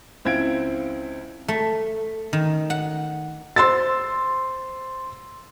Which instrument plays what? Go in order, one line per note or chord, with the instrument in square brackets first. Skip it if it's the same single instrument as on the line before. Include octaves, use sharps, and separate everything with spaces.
[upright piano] C#2 C4 E4 F5 G#6 D7
[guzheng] A3
D#3
F#5
[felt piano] C5 C6 E6 A6